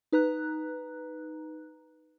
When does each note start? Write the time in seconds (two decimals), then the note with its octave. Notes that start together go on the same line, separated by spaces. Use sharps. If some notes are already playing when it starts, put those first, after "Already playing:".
0.12 D#4 B4 A#5 F#6